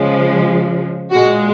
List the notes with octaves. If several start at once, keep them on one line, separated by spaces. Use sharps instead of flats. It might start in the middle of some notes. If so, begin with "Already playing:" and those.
Already playing: C#3 F3 G#3
A#2 G#3 F#4